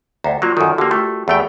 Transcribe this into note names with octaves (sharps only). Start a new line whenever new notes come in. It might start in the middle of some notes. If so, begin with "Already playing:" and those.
D2 D5 G5 A#5
F#3 A#3 F4 F#4
F#2 D#3 A4 A#4
D3 A#3 F#4 G4 G5
A3 G5
E2 A3 G#4 G5 B5